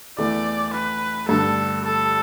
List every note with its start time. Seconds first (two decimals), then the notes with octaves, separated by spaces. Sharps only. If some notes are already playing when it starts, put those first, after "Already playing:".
0.18 E2 E3 A3 D5
0.74 B4
1.29 G2 D3 A3 A4
1.84 A4